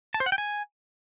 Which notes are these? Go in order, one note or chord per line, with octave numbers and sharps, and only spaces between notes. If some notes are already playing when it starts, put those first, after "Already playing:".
A5
C5
F#5
G5
G#5